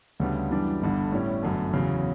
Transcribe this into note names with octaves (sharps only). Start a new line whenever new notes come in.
D2 C#3 G3 B3 D4
F#2 E3 G3 B3 D4
G1 G2 D3
A2 G3 C#4 E4
G1 F#2 D3 A3
E2 C#3 F#3